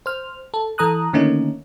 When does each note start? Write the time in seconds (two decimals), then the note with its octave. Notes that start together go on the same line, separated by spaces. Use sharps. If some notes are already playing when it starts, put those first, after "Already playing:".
0.06 C5 F6
0.54 A4
0.78 E3 A4 A#5 D#6 F#6
1.13 D3 D#3 A3 A#3 C#4 D#4